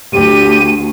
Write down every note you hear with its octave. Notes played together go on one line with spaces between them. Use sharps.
D2 G4 D#7